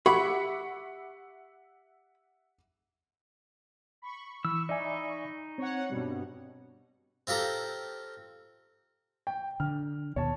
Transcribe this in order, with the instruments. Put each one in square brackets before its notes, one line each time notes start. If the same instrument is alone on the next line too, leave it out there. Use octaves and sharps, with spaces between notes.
[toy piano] G4 [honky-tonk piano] E5 F#5 D6 [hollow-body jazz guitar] B5
[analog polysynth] B5 C#6
[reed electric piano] E3 [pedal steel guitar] E6
[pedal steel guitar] D#4 [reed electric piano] D5 E5 G#5
[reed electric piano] C4 [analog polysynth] C#5 F#5
[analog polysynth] G2 B2 G3
[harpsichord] C4 F4 G4 A4 A#5
[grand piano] G5
[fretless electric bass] D3 [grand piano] F6
[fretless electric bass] D#2 B2 [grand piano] C#5 A5